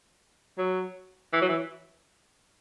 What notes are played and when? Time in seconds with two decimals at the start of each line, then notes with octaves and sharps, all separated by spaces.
0.58 F#3
1.33 E3
1.42 F#3
1.49 E3